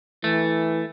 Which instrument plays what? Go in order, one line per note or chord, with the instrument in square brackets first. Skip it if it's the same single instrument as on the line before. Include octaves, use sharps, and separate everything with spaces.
[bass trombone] E3 [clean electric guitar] A3